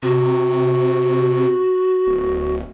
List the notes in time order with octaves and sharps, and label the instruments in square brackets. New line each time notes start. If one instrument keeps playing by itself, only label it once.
[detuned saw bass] C3 [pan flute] F#4
[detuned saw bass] D1